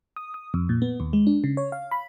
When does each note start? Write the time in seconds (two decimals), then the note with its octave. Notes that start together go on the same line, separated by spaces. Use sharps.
0.16 D#6
0.34 D#6
0.54 F2
0.69 A#2
0.82 B3
1.00 D#2
1.13 G#3
1.27 D4
1.44 C#3
1.57 C#5
1.72 F5
1.91 B5